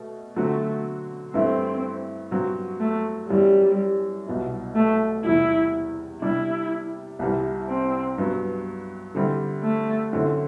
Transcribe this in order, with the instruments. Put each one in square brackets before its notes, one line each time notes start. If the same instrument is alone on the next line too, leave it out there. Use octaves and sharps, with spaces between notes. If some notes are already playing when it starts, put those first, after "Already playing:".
Already playing: [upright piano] B2 A3
[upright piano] D3 F#3 C4 F#4 [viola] A3
[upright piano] G2 E3 A3 E4 [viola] C4
[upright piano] G2 F#3 C4 F#4
[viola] A3
[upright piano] F#2 E3 B3 [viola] G3
[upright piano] C2 B2 F#3 B3 E4
[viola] A3
[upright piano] E2 C3 G3 [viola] E4
[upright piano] C3 G3 D4 [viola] E4
[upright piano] C2 C3 E3 G3
[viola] C4
[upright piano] G2 F#3 B3
D3 G3 C4 E4
[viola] A3
[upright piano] F#2 D3 A3 C4 E4